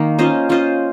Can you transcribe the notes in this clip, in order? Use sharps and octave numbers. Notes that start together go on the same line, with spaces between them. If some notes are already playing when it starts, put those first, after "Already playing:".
Already playing: D#3 A#3
C#4 F4 C5 D#5
C#4 F4 C5 D#5